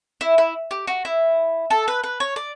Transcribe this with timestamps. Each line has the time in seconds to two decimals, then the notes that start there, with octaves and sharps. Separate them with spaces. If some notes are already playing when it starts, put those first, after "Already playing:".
0.21 E4
0.38 E4
0.71 G4
0.87 F#4
1.05 E4
1.70 A4
1.88 B4
2.04 B4
2.20 C#5
2.36 D5